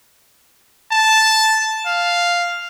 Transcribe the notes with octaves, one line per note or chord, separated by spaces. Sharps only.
A5
F5